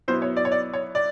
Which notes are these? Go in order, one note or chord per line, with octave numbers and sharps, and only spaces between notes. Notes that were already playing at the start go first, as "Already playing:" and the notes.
B2 F#3 B3 E4 C5
C#5
D5
C#5
D5
C#5
D5